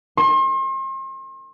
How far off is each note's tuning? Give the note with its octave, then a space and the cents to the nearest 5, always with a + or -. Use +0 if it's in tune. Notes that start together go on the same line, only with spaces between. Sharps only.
C6 +40